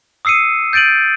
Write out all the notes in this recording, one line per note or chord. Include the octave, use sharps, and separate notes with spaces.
D#6 E6 C7 C#7 D#7
G6 A6 D7 D#7 F#7